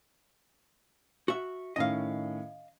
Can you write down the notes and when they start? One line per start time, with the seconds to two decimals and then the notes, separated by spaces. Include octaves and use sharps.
1.28 F#4 E5
1.76 A2 D#3 C#4 D#5 F5